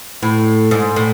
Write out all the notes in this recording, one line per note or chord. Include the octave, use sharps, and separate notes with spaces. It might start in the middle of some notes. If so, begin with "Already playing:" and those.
A2
G#2
A2